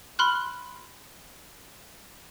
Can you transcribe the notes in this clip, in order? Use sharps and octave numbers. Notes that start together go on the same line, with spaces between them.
B5 C6 F6 F#6